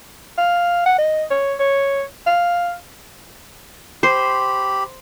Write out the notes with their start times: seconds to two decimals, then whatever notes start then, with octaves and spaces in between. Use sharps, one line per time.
0.38 F5
0.86 F#5
0.98 D#5
1.31 C#5
1.59 C#5
2.26 F5
4.03 G4 C5 B5